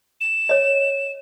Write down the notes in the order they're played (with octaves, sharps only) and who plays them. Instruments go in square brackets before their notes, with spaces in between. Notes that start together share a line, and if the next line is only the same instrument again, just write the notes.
[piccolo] E7
[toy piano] C#5 D#5